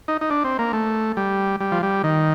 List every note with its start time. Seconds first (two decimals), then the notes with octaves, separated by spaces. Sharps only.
0.08 D#4
0.21 D#4
0.30 D4
0.44 C4
0.59 A#3
0.73 A3
1.17 G3
1.60 G3
1.72 F3
1.83 G3
2.04 D#3